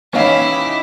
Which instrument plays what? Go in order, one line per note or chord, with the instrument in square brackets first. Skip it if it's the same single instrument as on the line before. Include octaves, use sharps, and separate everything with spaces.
[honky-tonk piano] E3 D#4 [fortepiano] C#4 F5 [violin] E4 G4